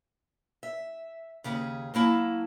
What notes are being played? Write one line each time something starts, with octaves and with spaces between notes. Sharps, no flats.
E5
D#2 C#3 G#4 B4
F#3 A#3 E4 A5